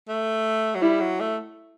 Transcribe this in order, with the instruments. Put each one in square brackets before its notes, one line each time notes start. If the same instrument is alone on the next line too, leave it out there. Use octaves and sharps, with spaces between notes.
[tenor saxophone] A3
F#3
[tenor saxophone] G3 [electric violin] E4
[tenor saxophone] F#3
A3